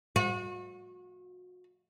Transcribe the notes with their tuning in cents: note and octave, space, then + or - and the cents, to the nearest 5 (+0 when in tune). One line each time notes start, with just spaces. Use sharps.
F#4 -35